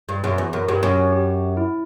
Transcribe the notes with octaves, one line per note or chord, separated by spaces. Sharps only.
G2
F#2
E2 B4
F#2 A#4
G2 G4
F#2 C#5
G4
E4